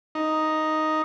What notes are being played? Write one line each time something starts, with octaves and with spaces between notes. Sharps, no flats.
D#4